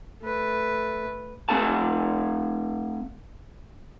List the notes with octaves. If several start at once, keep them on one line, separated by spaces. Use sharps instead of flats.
A3 B4
A3 C4 A4 G#5 A5